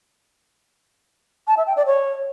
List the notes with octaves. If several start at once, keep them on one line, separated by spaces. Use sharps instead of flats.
A5
E5
G5
D5
C#5